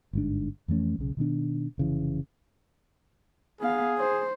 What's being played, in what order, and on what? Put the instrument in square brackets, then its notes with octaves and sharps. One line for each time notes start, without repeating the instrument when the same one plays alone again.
[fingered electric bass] G1 G#2 D4
F2 E3 A3 C#4
B1 C#3
B2 D#3 B3 D4
F1 C#3 E3
[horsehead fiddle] B3 F5 [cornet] G#4
[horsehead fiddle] C5